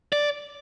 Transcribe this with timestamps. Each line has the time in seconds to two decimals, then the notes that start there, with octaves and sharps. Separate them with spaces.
0.13 D5